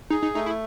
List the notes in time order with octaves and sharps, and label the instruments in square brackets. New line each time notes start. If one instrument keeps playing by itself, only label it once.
[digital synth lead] D#4 [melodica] G#4
[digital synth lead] D#4
[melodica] A3 [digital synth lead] D#4
[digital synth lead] E4